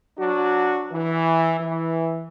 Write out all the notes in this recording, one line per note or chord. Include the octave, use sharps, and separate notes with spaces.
F#3 D4 F#4
E3
E3